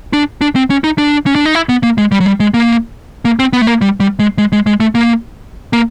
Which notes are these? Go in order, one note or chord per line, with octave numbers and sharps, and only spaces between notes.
D4
D4
C4
C#4
D#4
D4
C#4
D4
D#4
E4
B3
A#3
G#3
G3
F#3
G3
G#3
A#3
A#3
C4
B3
A3
A#3
G3
G3
G#3
G#3
G#3
G#3
A3
A#3
A#3